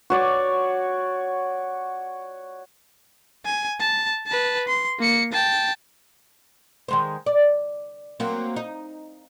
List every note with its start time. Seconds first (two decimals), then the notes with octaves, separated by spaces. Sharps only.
0.10 F#4 C#5 D5
3.45 G#5
3.80 A5
4.27 B4 A5
4.68 C6
4.99 A#3 C#7
5.33 G5 A5
6.88 D#3 G#3 C5
7.26 D5
8.20 F#3 A#3 C4
8.56 D#4